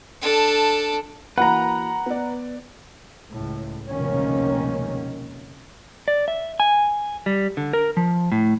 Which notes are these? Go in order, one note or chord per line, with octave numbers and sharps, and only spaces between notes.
D4 A4
E3 A#3 F#4 B4 F#5 A#5
B3 D5
C#2 A2
F1 C#2 B2 D#3 A#3 C#4
D5
E5
G#5
G3
D3
A#4
F3
A2